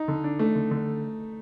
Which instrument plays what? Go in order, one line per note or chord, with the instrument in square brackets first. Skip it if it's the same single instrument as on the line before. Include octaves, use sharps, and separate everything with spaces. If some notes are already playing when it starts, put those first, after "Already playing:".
Already playing: [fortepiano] D#4
[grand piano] D3
D4
[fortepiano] A3 [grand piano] D4
[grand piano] D3
D3